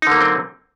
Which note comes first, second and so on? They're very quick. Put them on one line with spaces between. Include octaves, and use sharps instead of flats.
D#4 D3 A#3 F#3 C4